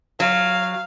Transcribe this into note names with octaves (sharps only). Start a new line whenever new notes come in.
F#3 F5